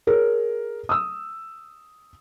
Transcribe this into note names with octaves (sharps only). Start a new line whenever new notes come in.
G#4 A#4 C#5
D#6 E6